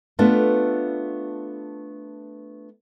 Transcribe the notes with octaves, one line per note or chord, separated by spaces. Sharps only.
A3 B3 D4 F4 A4 B4